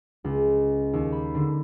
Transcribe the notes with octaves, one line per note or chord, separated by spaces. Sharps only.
C#2
D#2
B5
D3